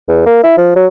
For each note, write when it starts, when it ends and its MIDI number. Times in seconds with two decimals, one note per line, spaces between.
0.09 0.25 40
0.26 0.41 58
0.43 0.58 64
0.58 0.74 53
0.76 0.87 54